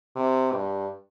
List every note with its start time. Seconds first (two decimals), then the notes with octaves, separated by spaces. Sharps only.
0.16 C3
0.53 G2